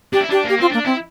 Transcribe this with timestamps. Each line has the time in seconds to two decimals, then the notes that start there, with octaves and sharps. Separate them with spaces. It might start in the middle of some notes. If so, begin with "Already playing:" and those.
0.13 D4 G4
0.21 E4
0.29 D4 G4
0.44 A#3 G4
0.58 C4 F4
0.71 A#3 D4
0.85 C4 E4